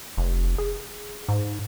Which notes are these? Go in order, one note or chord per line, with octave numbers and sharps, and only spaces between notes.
F1
G#4
G#2